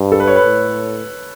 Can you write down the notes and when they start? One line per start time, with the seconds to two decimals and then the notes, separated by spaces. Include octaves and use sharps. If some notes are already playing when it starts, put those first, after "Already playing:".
Already playing: G2
0.12 A4
0.20 B4
0.28 C#5
0.36 B4
0.44 A2